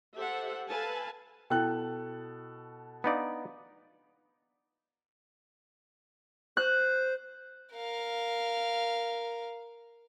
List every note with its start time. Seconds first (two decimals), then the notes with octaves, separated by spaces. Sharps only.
0.15 G4 A4 C5 E5 F#5
0.69 A4 B4 F5 G#5 A5
1.50 B2 E4 A4 G5 F#6
3.04 B3 D4 D#4 D5 F5
6.57 C5 F#6
7.74 A#4 F5